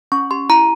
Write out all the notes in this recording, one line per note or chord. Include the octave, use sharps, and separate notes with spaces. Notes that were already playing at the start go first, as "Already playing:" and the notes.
C#4 C#6
G4 C6
E4 A#5